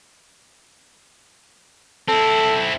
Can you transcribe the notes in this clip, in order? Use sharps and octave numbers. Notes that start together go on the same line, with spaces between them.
C4 E4 A4